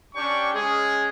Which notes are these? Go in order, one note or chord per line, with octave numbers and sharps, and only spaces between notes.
C#4 D4 G4 D5 G5 C#6
G#3 C#4 G#4